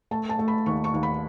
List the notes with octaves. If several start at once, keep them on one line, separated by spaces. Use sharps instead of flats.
A3 A5
A5
A3
B5
D#2 C#6
C#6
D#2
B5